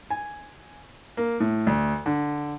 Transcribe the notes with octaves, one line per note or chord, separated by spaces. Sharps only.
G#5
A#3
A2
D2
D3